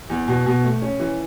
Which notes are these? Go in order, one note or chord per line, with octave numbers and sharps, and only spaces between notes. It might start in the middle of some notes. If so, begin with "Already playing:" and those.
E2
B2
B2
A3
C#4
E3